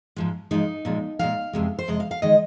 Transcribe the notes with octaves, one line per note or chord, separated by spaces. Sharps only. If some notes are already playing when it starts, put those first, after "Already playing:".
G#2 F3 G#3
G#2 F3 G#3 D#4
A#2 F3 G#3
A#2 F3 G#3 F5
F2 C3 G#3
C5
F2 C3 G#3 D#5
F5
F5
D#3 G#3 D#5